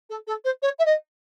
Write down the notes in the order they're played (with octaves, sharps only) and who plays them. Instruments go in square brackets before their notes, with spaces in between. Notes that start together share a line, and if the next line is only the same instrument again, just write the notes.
[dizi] A4
A4
C5
C#5
E5
D#5